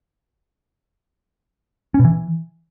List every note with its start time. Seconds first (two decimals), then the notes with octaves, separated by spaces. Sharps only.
1.94 C#4
1.99 B2
2.05 E3